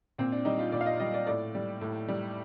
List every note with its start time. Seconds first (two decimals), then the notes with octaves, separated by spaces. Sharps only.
0.18 A#2 C4
0.32 D4
0.45 G3 D#4
0.59 F4
0.72 A#2 D5
0.81 F5
0.86 D#5
1.00 G3 D#5
1.14 D5
1.27 A2 D5
1.55 G3
1.81 A2
2.08 G3